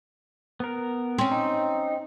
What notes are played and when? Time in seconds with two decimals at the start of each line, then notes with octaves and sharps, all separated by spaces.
0.60 B3 A#4
1.18 C4 C#4
1.31 D#4